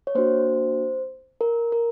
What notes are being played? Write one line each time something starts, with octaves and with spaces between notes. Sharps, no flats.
C#5
A#3 D4 F#4 C5
A#4
A#4